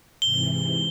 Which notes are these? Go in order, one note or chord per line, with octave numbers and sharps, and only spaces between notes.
G#2 C3 E3 G7